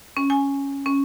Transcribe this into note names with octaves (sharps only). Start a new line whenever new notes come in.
C#4
G#5
C#4